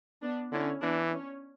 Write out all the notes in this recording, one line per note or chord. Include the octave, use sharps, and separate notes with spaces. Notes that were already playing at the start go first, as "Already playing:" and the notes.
B3 D4
D3 C#4 E4
E3 B3 D4
C#4